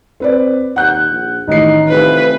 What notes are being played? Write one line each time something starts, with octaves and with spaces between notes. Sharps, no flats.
C4 B4 D5
D#2 F#5 F#6 G6
A#1
A1 D#3 D#4 C7
F1 B4